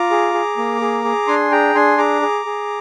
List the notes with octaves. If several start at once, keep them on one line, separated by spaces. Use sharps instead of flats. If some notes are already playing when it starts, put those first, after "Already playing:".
Already playing: F4 A#5 D6
G#4
G#4
A#3
G#4
G#4
D4 G#5 C6
G#4 G5 A#5
D4 G#5 C6
G#4 A#5 D6
G#4
G#4